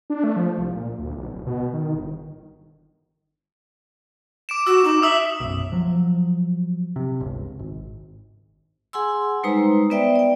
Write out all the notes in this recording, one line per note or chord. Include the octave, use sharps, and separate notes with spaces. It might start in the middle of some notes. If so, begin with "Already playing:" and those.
D4
A3
F3
C2
A#2
D2
B1
D1
B2
D#3
G1
D6 D7 E7
F#4 E6
D#4 D6
E5 D#6 E6 F#7
B1 F#2
F3 F#3
C3
G1 C#2
G#1
G#4 F#5 G#5 C6 E6
G3 G#3 D#4 B4 C5 A#5
B3 B4 D5 E5 G5
D5 G5